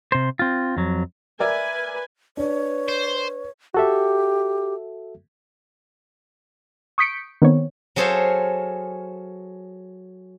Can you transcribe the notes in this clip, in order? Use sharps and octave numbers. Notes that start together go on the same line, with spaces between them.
C3 C5
C4 F4
F2 F#3
A#4 B4 D5 E5 G#5
D4 B4 C#5
C5
F#4 G4 A4 E5
C#6 D#6 G6 B6 C#7 D7
D#3 B3 C4 C#5
F#3 G#4 A4 C5 C#5 F5